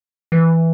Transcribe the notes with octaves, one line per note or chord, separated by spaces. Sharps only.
E3